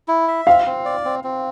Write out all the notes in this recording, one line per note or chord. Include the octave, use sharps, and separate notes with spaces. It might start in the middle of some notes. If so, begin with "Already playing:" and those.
E4
E5
C4 F5
C4
D5
C4
C4